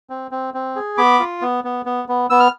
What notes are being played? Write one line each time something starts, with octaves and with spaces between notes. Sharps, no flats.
C4
C4
C4
G#4
B3 B5 D6
F4
B3
B3
B3
B3
B3 E6
F6